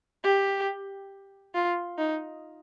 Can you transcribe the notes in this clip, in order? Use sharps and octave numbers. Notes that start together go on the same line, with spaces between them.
G4
F4
D#4